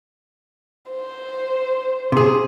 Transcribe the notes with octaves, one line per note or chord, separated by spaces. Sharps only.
C5
C3 G#4